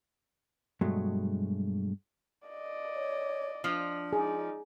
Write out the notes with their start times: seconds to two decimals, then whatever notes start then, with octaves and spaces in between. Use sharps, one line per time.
0.81 G2 B2 F#3 G#3 A3
2.48 D5 D#5
2.94 C#5
3.64 F3 D4 F4
4.13 D#4 G#4 D5